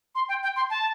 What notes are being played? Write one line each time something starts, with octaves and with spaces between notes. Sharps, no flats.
C6
G5
G5
C6
A5